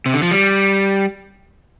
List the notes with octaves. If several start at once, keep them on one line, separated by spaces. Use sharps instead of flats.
C3
D3
F3
G3